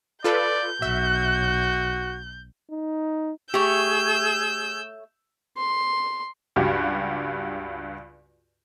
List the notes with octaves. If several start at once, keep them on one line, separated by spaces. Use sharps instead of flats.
F4 A4 B4 D5 G6
B1 F#4 E5
D#4
A3 G4 G#4 C#5 E6 G6
C6
C#2 G2 F#4 G4